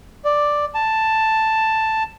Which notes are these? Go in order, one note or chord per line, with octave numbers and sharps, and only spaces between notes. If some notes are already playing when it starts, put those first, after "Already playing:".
D5
A5